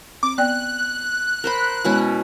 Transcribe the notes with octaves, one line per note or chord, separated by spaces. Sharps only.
C4 D6
B3 D5 G5 F#6
A#4 C5 B5
B2 G#3 C#4 E4